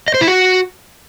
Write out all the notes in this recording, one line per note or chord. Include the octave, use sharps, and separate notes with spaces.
D#5
C5
E4
F#4